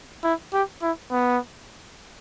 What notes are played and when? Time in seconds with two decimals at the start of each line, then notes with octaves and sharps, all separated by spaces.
0.24 E4
0.53 G4
0.82 E4
1.11 B3